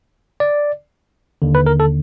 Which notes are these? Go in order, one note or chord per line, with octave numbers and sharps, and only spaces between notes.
D5
D#2 D3
B4
A#4
A4